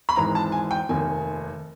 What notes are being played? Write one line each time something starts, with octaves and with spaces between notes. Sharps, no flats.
B5
G#1 G#2 E3 A#5
A5
G#5
G5
F1 D#2 D#3 G#5